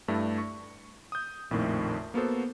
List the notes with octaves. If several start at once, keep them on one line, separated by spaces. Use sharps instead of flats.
G2 A3 D4 E4
C#6
D#6 G6
A#1 F2 A2 D#3 A#3
A#3 B3 F#4 A4 C5